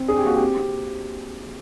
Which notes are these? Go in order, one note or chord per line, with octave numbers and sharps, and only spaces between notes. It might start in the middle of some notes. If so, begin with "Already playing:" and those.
Already playing: C4
D4 G#4
G4
A#3 F#4
C4 G4
C4